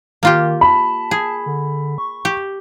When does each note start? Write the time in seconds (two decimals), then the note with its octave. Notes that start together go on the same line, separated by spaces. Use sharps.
0.23 D#3 A#3 F4 G4
0.61 A5 B5
1.11 G#4
1.46 D3
1.98 C#6
2.25 G4